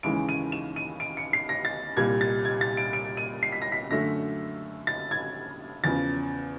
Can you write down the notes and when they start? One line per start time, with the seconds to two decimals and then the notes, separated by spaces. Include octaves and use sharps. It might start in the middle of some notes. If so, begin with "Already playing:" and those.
0.03 D#2 C#3 E3 G#3 D7
0.29 D#7
0.52 E7
0.76 D#7
1.00 D7
1.17 C#7
1.33 C7
1.49 A#6
1.65 A6
1.97 C2 A#2 G3 G#6
2.21 A6
2.45 G#6
2.61 A6
2.77 D7
2.93 D7
3.17 D#7
3.43 C7
3.52 B6
3.62 A#6
3.72 B6
3.90 F#2 D3 F#3 A3 A#6
4.87 A6
5.11 G#6
5.84 E2 C#3 F3 A6